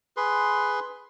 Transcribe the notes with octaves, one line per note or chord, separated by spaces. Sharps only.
G#4 B4 C6